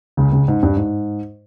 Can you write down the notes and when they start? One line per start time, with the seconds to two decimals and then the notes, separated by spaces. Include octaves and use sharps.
0.17 C#2 C#3
0.32 C#2 C#3
0.48 G#2
0.63 G2
0.77 G#2